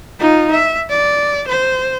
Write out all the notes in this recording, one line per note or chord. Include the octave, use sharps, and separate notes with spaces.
D#4 F4
E5
D5
C5